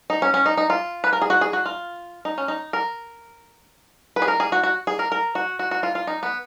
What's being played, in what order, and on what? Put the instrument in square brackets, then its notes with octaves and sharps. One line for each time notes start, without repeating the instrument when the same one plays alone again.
[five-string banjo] D#4
C#4
C#4
D#4
D#4
F4
B4
A#4
G#4
F#4
G#4
F#4
F4
D#4
C#4
D#4
A#4
B4
G#4
A#4
G#4
F#4
F#4
G#4
A#4
A#4
F#4
F#4
F#4
F4
F4
D#4
B3